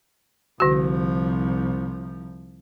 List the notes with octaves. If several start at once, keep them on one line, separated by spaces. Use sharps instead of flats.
C2 D3 F3 F#4